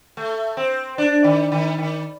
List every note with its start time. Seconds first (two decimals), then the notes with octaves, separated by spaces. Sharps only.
0.17 A3
0.57 C4
0.98 D4
1.24 D#3
1.52 D#3
1.78 D#3